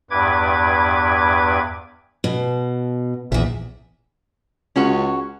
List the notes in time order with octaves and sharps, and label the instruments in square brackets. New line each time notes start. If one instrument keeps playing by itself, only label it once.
[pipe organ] E2 G2 B4 D6 G#6
[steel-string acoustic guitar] B2
[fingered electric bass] A#1 [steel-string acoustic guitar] E2 E5
[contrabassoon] C#2 [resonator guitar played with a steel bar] C#4 F#4